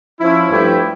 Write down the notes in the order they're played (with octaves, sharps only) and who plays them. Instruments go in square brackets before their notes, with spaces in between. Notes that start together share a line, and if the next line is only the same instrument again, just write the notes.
[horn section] F3 C#4 E4
G2 F3 A3 E4 G4